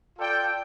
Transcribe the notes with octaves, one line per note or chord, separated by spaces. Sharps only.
F4 A4 D5 G5